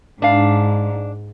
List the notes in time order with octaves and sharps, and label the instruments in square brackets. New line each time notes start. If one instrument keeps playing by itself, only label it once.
[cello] G#2 [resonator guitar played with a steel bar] D4 F5